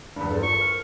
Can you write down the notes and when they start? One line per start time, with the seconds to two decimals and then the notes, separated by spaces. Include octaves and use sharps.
0.16 E2 G2
0.31 A4 C5
0.43 F4 A#4 C#6
0.61 F6